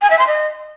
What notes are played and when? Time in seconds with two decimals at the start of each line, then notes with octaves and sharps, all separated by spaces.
0.02 G#5
0.10 E5
0.19 C6
0.27 D#5